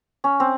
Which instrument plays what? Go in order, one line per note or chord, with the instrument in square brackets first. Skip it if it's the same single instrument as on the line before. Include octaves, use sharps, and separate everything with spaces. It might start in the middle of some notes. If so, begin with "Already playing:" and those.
[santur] C#4
C4